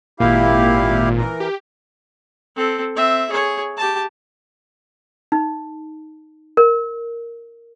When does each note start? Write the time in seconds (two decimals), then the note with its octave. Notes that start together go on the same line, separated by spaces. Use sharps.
0.20 G#1 A#2 E4 G4 F5
1.18 E3 A#4
1.40 G4
2.56 C4 A4
2.96 C4 E5
3.30 G#4 C#5
3.77 G4 A5
5.32 D#4
6.57 A#4